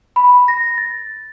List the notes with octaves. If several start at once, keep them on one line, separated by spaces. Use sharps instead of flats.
B5
A#6
A6